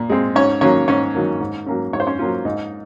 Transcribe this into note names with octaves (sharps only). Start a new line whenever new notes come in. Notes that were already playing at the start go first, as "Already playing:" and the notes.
Already playing: A#2
G#3 C4
G#2 C#4 C#5
D#3 F#3 A#3 C#4 C#5
G#2 C#4 C#5
D#3 F#3 A#3
G#2
F#3 A#3 C#4
G#2 C#5
C5
C#4 C#5
F#3 A#3 C#4 F4
G#2 D#4